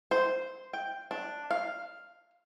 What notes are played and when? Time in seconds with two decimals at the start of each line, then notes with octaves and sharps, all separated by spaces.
0.11 C5
0.73 G5
1.11 D4
1.51 F5